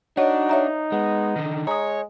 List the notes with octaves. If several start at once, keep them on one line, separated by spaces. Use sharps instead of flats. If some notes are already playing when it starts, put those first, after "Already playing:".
D4 D#4 F#4 C#5 D#5
C#5 E5 A#5
G#3 B3
D3 D#3
G#3 C#5 A#5 D#6